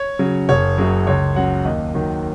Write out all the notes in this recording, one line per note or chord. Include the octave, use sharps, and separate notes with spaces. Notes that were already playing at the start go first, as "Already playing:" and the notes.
Already playing: C#5
C#3 F#3
F#1 C#5
F#2 C#3 F#3
C#2 C#5
C#3 F#3 F#5
D#2 D#5
D#3 F#3